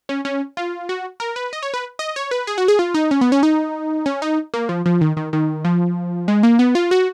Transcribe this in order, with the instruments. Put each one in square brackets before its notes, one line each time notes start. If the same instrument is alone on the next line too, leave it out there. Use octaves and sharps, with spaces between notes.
[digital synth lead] C#4
C#4
F4
F#4
A#4
B4
D#5
C#5
B4
D#5
C#5
B4
G#4
F#4
G#4
F4
D#4
C#4
B3
C#4
D#4
C#4
D#4
A#3
F3
F3
D#3
D#3
D#3
F3
G#3
A#3
B3
F4
F#4